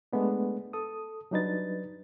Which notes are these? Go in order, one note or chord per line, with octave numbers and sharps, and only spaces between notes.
G#3 A3 B3 D4
A4 D#6
F#3 G3 D4 D#4 B4 A6